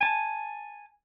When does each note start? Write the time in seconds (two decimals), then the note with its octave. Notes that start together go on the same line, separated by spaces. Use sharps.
0.01 G#5 A5